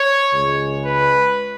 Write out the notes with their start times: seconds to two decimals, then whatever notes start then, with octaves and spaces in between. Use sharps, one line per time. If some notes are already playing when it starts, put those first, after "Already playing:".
Already playing: C#5
0.33 C#2 C#3 G#3
0.85 B4